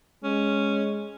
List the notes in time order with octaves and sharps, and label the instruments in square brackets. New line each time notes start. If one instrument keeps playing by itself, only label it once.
[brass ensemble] G#3 [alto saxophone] C#4